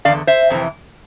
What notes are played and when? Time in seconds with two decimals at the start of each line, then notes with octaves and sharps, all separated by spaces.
0.05 E2 D3 F3 D5 F5
0.27 C5 E5
0.50 F2 C3 E3